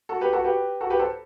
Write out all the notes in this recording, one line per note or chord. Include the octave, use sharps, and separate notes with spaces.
F#4 A4
G4 B4
F#4 A4
G4 B4
F#4 A4
G4 B4
A4 C5